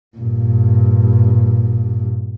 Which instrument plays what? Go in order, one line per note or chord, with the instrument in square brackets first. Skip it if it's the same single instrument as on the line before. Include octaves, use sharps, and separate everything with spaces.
[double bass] G2 A#2